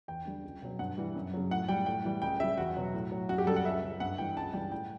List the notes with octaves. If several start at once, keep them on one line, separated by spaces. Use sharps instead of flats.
E2 G5
D3 G3
C#2
B2 F#3
G2 F#5
E3 G3
F#2
C#3 F#3
A2 F#5
G3 G5
A2 G5
E3 G3
C#2 G5
C#3 G3 E5
E2 F#4
B2 F#3
A2
F#3
F#2 F#4
G4
C#3 G3 A4
F#5
C#2 E5
C#3 F#3
G2 F#5
E3 G3 G5
C#2 A5
C#3 E3 G3 G5
A2 G5